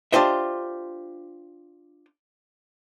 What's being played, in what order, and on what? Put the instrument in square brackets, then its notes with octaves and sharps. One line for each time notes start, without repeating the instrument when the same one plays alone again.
[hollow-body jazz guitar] D4 F4 G4 C5 D#5 E5